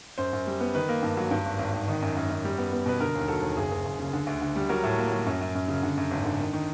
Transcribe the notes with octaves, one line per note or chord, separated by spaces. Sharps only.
F#2 C5
F#2
G3
B3
D#3 B4
A#3
G2
F#3
G2
G#1
G#1
G#1
D#3
F#2
F#2
F#2
G3
B3
B3
B2 B4
D3 A#4
D#2 A#4
F#3 A4
D#2
F#1 G#4
F#1
F#1
C#3
D3
D2
D3
G3
F#3 A#4
A2
A#3
F#3
F#2
F#2
F#2
C#3
D3
F#2
G#1
D3
D#3
D#3